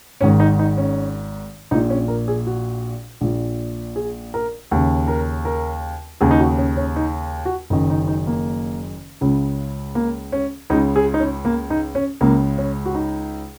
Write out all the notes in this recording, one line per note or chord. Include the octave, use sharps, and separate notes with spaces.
G#1 G#2 D#3 C#4
D#4
D#4
C#4
A#1 A#2 D#4
C#4
A#4
G#4
F#4
A#1 A#2
G#4
A#4
D#2 C#3
A#4
A#4
D#2 C#3 G#4
D#4
F#4
C#4
C#4
D#4
F#4
F#1 F#2 D#3 D#4
D#4
D#4
A#3
C#2 C#3
A#3
C#4
C#2 C#3 D#4
G#4
D#4
C#4
A#3
D#4
C#4
C#2 C#3 A#3
C#4
F#4
D#4